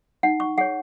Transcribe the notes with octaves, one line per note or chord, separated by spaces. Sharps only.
D#4 F#5
C#6
G#4 C#5 F#5